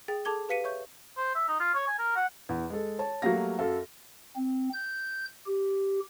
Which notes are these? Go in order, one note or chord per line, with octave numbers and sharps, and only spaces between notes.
G#4 G5 A6
G#4 A4 A5 D6 G#6 G7
G4 B4 F5 B6 C#7 D#7
C#5 E5 C#6 G6
C5
E5
D#4
F4
C#5
G#5
A#4
F#5
E2
G#3 A4
C#5 A5
F#3 G3 A3 A#3 F5 A#6
F#2 A4 F5
C4
G6
G4